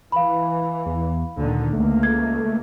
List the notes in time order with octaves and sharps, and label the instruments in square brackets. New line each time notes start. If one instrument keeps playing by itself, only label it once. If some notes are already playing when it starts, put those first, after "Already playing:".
[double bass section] E3 [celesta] F5 B5
[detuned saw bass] E2
[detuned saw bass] D2 [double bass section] A#2 D3 D#3
[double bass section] C#2 A#3 [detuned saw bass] A3
[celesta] G#6